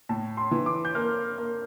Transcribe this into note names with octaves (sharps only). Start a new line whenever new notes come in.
A2 A5
C6
E3
D6
G6
A#3 F6
A#3